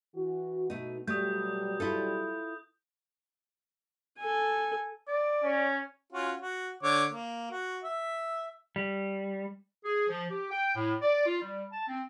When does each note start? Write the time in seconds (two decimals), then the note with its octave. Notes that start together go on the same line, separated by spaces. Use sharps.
0.15 E3 F#4
0.70 B2 A3 D#4
1.07 B2 F#3 G3 A3 D#6 G6
1.80 E4 F4 A4
4.19 A4 G#5
5.08 D5 D6
5.44 C#4 C#5
6.13 C#4 F4 F#4
6.40 F#4
6.83 D3 C#5 D6
7.10 A#3
7.51 F#4
7.84 E5
8.76 G3
9.85 G#4
10.08 F3
10.30 G4
10.51 G5
10.76 A2
11.02 D5
11.26 F4
11.41 G3
11.72 A5
11.88 C4